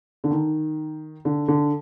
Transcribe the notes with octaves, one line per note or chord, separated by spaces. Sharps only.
D3
D#3
D3
D3